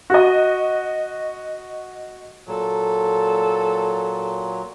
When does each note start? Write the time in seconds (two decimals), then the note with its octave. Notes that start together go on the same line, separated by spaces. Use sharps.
0.10 F#4 D#5
2.48 A#2 F#3 A4